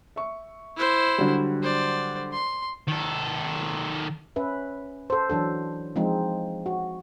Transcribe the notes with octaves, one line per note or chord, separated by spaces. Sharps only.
E5 C#6
E4 C5
D3 F#3 G3
C5 D5
C6
D#3 A4
C#4 B4 E5
A4 C5
E3 F#3 D4 A4
F3 G#3 C4 D#4
F#4